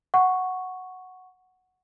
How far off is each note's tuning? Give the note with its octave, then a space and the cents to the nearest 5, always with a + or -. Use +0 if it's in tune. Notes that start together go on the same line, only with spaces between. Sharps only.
F#5 +0 C#6 +0